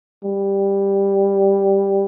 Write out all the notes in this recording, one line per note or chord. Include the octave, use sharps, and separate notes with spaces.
G3